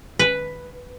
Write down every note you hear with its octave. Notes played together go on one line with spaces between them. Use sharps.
B4